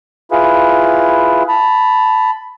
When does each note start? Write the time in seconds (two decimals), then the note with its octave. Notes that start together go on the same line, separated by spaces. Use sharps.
0.31 E4 F4 G#4 B4
1.49 A5 B5